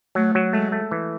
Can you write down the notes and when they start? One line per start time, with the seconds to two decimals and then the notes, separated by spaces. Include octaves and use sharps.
0.15 F#3 A3
0.35 F#3
0.53 G#3 A3
0.72 A3
0.91 E3